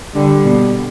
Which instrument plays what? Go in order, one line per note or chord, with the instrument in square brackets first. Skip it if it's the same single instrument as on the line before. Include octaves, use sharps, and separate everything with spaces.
[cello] D3 [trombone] G3
[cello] B2